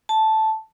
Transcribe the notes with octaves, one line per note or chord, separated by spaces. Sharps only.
A5